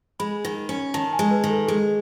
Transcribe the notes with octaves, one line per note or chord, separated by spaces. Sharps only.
G#3 B5
D#3
C#4
D#3 A5
G#5
G#3
B4
D#3
A4
G#3 G#4